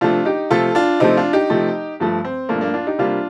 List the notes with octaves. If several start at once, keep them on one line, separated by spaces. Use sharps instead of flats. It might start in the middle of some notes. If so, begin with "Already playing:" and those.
C3 F3 A3 D4 F4
D#4 G4
C3 F3 A3 F4 A4
D4 F4
C3 F3 A3 C4 D#4
D4 F4
D#4 G4
C3 F3 A3
G2 F3 A3
C4
G2 F3 A3 A#3 D4
A#3 D4
D4 F4
D#4 G4
C3 G3 A#3 D4 F4